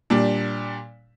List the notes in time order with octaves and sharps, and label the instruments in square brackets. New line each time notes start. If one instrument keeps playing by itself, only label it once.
[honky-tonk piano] A#2 G3 D4